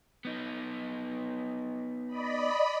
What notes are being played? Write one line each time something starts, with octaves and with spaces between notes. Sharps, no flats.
B3 D#4
D5 D#5 B5